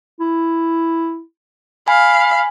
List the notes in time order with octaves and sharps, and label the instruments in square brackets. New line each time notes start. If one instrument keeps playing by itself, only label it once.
[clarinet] E4
[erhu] F5 [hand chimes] G#5 [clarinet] B5